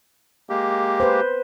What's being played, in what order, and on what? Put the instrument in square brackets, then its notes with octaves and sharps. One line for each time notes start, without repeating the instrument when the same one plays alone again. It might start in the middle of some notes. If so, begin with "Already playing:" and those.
[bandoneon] G#3 A#3 G4
[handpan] B4 C5